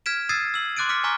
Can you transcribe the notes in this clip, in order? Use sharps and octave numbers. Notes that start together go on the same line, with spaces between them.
F6 G#6 B6 D7 E7
D#6 E6 G#6 A6 C7 D#7
E6 F#7
C6 D6 F#6 A6 D7 D#7
D6 F6 B6 C#7
G#5 A#5 C#6 D6 F6 B6